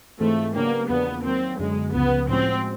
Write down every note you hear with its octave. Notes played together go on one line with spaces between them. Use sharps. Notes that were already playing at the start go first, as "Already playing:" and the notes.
G#2 E3 G#3 A3 C4 F4
C#3 F#3 A#3 B3 D4 G4
E2 C#3 F3 A#3 B3 D4
D#3 F#3 A#3 C4
F#2 D3 F#3 G#3 B3
C#2 C#3 F3 B3
A2 F3 G#3 C4 C#4 F#4